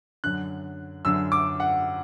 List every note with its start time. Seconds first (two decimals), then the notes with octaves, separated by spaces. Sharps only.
0.24 F#2 D3 F#6
1.05 F#2 D3 E6
1.32 D6
1.60 F#5